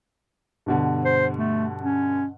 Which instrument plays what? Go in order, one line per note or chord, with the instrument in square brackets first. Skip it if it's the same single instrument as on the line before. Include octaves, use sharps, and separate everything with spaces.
[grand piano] G2 B2 D3
[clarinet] C5
A3
C#4